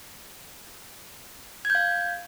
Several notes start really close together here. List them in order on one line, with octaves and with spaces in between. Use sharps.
G#6 G6 F5